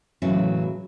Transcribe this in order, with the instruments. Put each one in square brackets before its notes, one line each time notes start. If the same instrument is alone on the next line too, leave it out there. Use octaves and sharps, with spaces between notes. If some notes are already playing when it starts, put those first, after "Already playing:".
[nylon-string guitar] A2 C#3 E3 F#3 C#4 E4